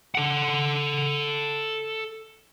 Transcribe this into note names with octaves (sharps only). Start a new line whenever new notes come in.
A4 F#5